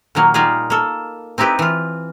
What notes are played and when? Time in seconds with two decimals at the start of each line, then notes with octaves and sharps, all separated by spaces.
0.15 A#2 D#3 F#3 A#3
0.34 G3 D#4 F4 G#4
0.70 A#3 A4
1.38 C4 D#4 E4 G4 B4
1.59 E3 F4